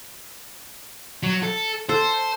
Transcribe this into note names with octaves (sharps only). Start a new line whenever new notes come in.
F#3
A4
A4 C5